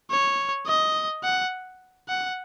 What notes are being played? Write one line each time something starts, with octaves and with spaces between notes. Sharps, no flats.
C#5
D#5
F#5
F#5